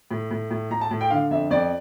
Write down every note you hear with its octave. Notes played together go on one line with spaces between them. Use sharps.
A2
A2
A2
A2 A#5
A5
A2
G5
D3 F5
F2 E5
F2 D5